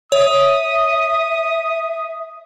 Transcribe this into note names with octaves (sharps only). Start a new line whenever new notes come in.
C#5 E5 D#6